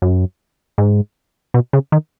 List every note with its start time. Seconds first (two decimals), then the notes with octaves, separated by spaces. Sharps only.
0.02 F#2
0.78 G#2
1.54 B2
1.73 C#3
1.92 D#3